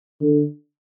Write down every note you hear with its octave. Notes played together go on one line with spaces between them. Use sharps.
D3